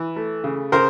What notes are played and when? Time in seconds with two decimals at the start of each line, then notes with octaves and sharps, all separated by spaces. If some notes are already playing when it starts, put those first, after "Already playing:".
Already playing: E3
0.16 A3
0.44 C#3
0.72 C#3 A#4 C5